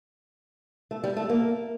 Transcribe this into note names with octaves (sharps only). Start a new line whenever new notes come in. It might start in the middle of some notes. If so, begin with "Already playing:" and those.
A3
G3
A3
A#3